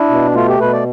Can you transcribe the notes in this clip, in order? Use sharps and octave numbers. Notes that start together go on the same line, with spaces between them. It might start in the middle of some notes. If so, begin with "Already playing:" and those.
Already playing: D4 E4
B2
A3 F4
G4
B2 B4
D5